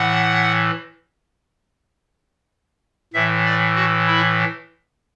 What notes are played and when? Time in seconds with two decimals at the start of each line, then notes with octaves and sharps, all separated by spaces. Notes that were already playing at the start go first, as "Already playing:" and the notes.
Already playing: A2 E3 F#5
3.14 A2 E3 E5
3.45 D5
3.76 F#4
4.07 E4